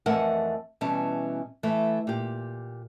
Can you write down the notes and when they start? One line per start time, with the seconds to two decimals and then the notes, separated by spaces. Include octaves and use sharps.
0.06 F2 E3 A3 A#4 D#5 F#5
0.81 B2 E3 G3 C#4 A5
1.63 E3 A3
2.07 A#2 G4